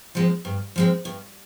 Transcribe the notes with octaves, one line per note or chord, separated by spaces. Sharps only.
F3 G#3 C4
G2
F3 G#3 C4
G2